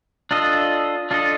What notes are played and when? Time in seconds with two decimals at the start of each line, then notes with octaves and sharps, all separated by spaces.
0.31 D4 F4 A4 D#5
1.11 D4 F4 A4 D#5